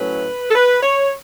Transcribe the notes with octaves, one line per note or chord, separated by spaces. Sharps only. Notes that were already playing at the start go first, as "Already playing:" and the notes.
Already playing: A2 F#3 A3 C#4 B4
A4
B4
C#5